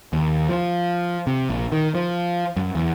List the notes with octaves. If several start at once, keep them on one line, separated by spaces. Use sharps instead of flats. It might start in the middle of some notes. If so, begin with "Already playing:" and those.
D#2
F3
C3
A#1
D#3
F3
F#2
E2